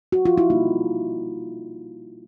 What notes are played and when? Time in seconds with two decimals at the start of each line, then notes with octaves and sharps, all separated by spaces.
0.12 F#4
0.25 F4
0.38 E4
0.50 B2 G3 A#3 D#4